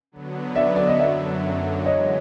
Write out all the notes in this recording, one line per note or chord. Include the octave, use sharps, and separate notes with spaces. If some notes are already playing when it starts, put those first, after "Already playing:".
D3 F#3 B3
D5 E5
D5
D#5
F#2 D3 F#3 D5 E5
E3 G#3 B3 C#5 D#5